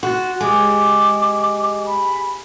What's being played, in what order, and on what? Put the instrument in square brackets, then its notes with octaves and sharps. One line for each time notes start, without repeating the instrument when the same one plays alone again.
[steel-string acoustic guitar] F#4 [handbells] C6 F#6 A6
[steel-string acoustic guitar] G#3 [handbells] G4 G#4 G#5 [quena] D6
[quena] B5